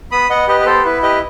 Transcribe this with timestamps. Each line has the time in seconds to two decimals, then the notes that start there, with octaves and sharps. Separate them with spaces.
0.11 B3 B5 D#6
0.30 B3 D#5 F#5
0.48 G4 B4 D#5
0.60 B4
0.66 B3 A4 C5
0.85 E4 B4
1.03 G4 B4 D#5